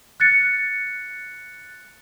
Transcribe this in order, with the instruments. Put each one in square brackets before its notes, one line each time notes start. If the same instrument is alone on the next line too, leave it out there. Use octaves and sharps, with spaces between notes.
[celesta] F#6 A6 C#7